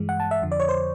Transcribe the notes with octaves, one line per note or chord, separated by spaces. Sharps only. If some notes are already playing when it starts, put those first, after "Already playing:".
Already playing: G2 E3 G#3
F#5
A5
E5
F2 D3 F3
D5
C#5
C5